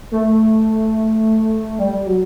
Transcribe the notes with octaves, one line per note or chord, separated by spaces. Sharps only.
A3
G3
G3
F#3